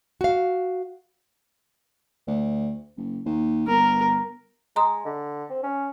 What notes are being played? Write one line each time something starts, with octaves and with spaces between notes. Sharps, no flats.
F#4 F5
D2
F#1
D#2
G1 A#4
G#3 A#5 C6 D#6
D3
C4
C#4